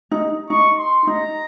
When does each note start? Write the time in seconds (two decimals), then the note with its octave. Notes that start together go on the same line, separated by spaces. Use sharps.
0.11 D#4
0.50 D#4 C#6
0.78 C6
1.07 D#4 A#5